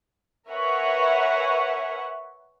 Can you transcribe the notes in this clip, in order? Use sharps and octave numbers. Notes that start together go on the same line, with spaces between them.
A#4 B4 C#5 E5 F#5 G#5